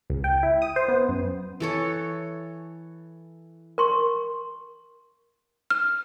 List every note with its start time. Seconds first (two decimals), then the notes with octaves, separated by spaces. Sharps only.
0.10 C#2
0.24 G5
0.43 E4
0.62 D#6
0.76 C5
0.88 B3
1.09 F#2
1.60 E3 A4 C#5
3.78 A#4 C6 C#6
5.70 F6